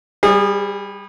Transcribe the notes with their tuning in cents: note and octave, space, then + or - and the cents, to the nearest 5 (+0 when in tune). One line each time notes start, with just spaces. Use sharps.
G3 +5 G#4 -30